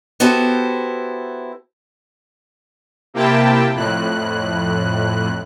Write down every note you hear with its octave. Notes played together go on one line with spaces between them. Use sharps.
B3 E4 F#4 G4 A4 C5
C3 A#3 E4 G4 G5 A5
F2 A2 F#6